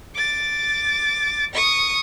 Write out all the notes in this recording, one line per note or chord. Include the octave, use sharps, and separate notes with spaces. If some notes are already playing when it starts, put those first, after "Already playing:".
D6 A6
C#6 D#6